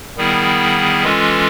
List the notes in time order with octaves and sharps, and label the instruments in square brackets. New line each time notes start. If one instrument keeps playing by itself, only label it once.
[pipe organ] D#3 G3 B3 E4 G#4
E3 G#3 C#4 F4 A4